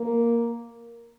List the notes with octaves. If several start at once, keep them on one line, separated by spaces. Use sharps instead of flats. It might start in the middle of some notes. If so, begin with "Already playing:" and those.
Already playing: A#3